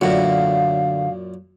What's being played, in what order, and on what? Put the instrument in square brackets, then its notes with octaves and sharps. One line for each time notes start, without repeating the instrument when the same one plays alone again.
[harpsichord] F#2 A#2 [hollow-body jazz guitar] D3 A3 F#4 [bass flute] F5